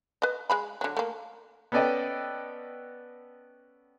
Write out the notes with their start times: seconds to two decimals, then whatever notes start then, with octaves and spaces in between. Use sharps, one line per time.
0.22 B4 D#5
0.50 G#3 G#4 B5
0.81 D3 F#3
0.97 A3 A#3
1.72 B3 C#4 A4 D5 D#5 G5